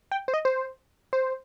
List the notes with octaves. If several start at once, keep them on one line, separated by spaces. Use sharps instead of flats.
G5
C5
D#5
C5
C5